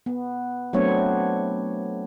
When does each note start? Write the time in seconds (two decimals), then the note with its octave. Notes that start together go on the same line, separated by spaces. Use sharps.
0.06 B3
0.73 F#3 A3 B3 C4 D4 C#5